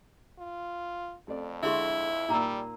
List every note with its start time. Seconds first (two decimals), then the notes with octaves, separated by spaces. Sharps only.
0.39 F4
1.28 F2 A3 C4 D5
1.63 D3 G#3 E4 E5 C6 C#6
2.29 A#2 G3 A#3 D#4 A#5 E6